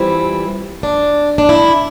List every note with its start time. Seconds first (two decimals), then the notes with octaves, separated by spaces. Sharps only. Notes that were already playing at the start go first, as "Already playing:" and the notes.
Already playing: F2 E3 G3 C4 E4
0.83 D4
1.38 D4
1.49 E4